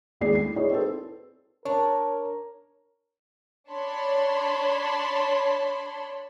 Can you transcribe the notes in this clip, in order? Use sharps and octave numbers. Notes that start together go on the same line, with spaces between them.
G#1 D#2 A2 G#4 D5 C7
A2 C7
D#4 E4 G#4 C#5 D5
C4 E4 G#4 A4 B4
D4 A#4 C#5
D4 C#5 A5 B5 C6